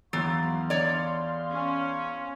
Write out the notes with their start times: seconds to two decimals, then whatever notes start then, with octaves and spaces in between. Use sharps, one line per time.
0.13 E2 F#3 F5 C6 A6
0.70 C#5 D5
1.51 C#4